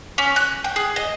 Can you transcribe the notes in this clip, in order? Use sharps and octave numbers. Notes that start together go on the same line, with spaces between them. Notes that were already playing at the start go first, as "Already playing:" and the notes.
C#4
F#6
G5
G#4
D#5